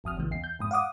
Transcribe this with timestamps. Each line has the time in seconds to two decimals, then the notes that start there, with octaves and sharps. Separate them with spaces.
0.04 G1 F2 D#6 F6
0.17 A1 C#3 E3
0.31 E2 C7
0.44 G6
0.59 F2 G#2 D#6
0.71 F5 F#5 D6 D#6